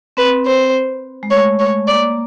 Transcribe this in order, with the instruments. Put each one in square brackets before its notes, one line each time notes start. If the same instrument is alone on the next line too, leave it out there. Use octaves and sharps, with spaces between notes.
[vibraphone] C4 [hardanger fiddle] B4
[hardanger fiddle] C5
[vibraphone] G#3
[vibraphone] A3 [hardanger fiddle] C#5
[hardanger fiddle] C#5
[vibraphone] A#3 [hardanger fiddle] D5